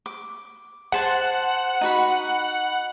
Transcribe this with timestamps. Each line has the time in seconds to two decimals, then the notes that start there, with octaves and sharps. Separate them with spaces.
0.06 D6
0.92 G#4 C5 F#5 A5
1.81 D#4 F#4 B5